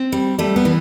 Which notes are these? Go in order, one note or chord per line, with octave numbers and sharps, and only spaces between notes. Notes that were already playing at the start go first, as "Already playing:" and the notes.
Already playing: C4
G3
G3 A3
B3
E3